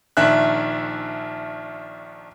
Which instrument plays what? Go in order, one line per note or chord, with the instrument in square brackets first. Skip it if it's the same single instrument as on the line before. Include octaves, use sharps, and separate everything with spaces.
[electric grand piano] A#1 D#3 D4 E5 G#5 F#6